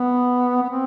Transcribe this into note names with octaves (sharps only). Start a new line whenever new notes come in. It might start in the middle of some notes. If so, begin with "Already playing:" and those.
Already playing: B3
B3
C4